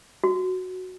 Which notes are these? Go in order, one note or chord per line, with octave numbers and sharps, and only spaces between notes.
F#4